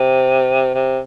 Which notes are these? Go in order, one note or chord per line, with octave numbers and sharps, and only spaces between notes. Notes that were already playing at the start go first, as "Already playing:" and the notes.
Already playing: C3
C3